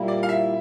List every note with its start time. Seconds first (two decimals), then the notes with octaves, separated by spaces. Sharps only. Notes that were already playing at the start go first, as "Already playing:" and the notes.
Already playing: A#2 G3 A#3 E4
0.08 D5
0.23 F5
0.29 E5